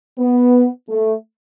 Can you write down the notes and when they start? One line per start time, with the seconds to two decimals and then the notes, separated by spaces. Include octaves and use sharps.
0.19 B3
0.89 A3